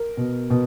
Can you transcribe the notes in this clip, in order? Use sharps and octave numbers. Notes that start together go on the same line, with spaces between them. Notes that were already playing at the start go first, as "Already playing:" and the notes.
Already playing: A#4
B2
B2